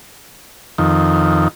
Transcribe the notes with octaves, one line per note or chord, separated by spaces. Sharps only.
F2 D#3